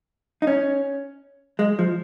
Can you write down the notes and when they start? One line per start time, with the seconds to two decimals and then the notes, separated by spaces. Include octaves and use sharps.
0.42 D#4
0.47 C#4
1.59 G#3
1.79 F3